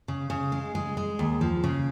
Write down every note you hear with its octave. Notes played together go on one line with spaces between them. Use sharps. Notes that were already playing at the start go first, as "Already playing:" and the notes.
C#3
C#3
G#3
G#3
G#3
D#2
F3
C#3